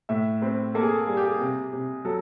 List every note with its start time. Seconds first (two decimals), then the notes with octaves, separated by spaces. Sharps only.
0.09 A2 E5
0.42 C4 B4
0.74 A#3 A4
0.83 G#4
0.91 A4
1.07 G3 G#4
1.17 G4
1.26 G#4
1.40 C3
1.73 C3
2.05 F#3 A4